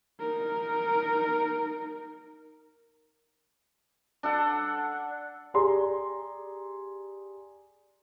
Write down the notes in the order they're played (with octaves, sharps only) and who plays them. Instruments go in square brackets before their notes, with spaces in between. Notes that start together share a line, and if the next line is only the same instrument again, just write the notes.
[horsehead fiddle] D#4 A#4
[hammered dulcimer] D4 A4 F#5
[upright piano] G4 G#4 D5 A#5 C6